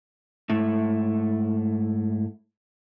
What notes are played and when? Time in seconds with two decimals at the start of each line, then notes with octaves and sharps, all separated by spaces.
0.50 G#2 A3 E4